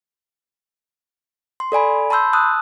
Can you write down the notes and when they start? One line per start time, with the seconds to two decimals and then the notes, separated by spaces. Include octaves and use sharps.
1.60 C6
1.72 A4 D5 G#5 B5
2.10 A5 B5 C6 E6 G6
2.33 A5 D#6 E6 F#6